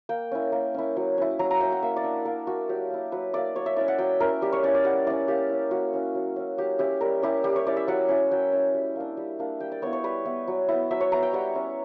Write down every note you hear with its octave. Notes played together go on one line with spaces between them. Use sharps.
A#3 G5
C#4 E4
A#3
C#4 E4
F#3
C#4 E4
F#3 A#5
A#5
C#4 E4 G5
F#5
A#3 E5
D5
D4
A#3 A#4
D4 F#4
F#3 G4
A#3 E4
F#3 B4
A#3 E4 D5
F#3 C#5
E5
C#4 E4 D5
F#5
F#3 G5
C#4 E4 A#4
G3 G4
C#5
C#4 E4 D5
D5
G3 F#5
C#4 E4 D5
A#3 G4
C#4 E4
A#3 F#4
C#4 E4
F#3
C#4 E4
F#3 G4
C#4 E4 G4
G3 A#4
C#4 E4 G4
G3 G4
C#5
C#4 E4 D5
E5
F#3 F#5
C#4 E4
F#3 G5
C#4 E4
G3
A#3 D4
G3
A#3 D4
G3 G5
D5
B3 E4 C#5
C#5
G3 B4
B3 E4
F#3
B3 E4
F#3 E5
C#5
B3 E4 A#5
G5
G3 F#5
C#4 E4